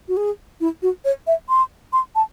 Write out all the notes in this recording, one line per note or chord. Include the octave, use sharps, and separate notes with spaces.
F#4
G#4
E4
F#4
C#5
E5
C6
C6
A5